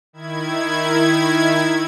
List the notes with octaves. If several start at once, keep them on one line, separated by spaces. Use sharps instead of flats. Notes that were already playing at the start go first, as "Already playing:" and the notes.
D#3 E4 G#6